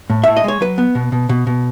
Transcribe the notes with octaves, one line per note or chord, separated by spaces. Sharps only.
A2
A2 E5
D#5
G#3 C#5
F#3 B4
B3
B2
B2
B2
B2